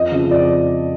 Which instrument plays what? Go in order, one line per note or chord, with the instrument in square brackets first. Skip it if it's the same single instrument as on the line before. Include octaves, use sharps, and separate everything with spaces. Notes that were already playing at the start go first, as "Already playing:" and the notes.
Already playing: [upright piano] F2 D#5
C#3 F3
F2 D5